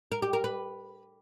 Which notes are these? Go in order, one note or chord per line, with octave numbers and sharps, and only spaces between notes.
A#4
G4
A#4
B4